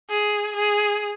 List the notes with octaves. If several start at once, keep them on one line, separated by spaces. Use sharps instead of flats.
G#4
G#4